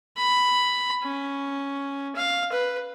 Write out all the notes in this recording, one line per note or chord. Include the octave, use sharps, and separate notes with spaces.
B5
C#4
F5
B4